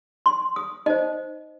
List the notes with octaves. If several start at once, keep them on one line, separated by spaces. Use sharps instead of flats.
C6
D#6
D#4 C5 D#5